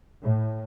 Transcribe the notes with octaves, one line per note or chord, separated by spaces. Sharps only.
A2